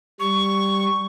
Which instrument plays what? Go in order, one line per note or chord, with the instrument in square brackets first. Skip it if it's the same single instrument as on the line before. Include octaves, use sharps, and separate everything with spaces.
[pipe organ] G3 [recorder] C#6